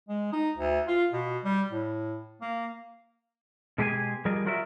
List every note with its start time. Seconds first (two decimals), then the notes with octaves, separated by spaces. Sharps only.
0.09 G#3
0.33 D#4
0.57 D2
0.88 F4
1.13 B2
1.44 G3
1.72 A2
2.41 A#3
3.78 B2 G#3 G4 G#4 A#4 G#5
4.25 F3 G3 G#4 A#4 D5 D#5
4.45 F#3 F4 F#4 A#4 D5 E5